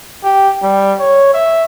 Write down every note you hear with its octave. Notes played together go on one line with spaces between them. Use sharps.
G4
G3
C#5
E5